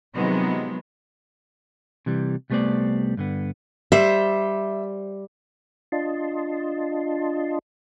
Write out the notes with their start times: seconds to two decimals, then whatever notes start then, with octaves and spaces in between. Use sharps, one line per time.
0.15 C3 D#3 F3 F#3 G#3 B3
2.06 C3 E3 G3
2.50 C2 G3 A3 B3 C5 D5
3.17 G2 D3 B3
3.92 G3 C5 E5
5.92 D4 F4 D#5 A5 C6